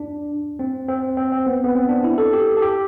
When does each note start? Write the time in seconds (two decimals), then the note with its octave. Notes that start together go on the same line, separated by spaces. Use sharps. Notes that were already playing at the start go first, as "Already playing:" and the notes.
Already playing: D4
0.59 C4
0.88 C4
1.17 C4
1.32 C4
1.46 B3
1.64 B3
1.75 C4
1.89 D4
2.04 E4
2.18 A4
2.33 G4
2.57 A4
2.62 G4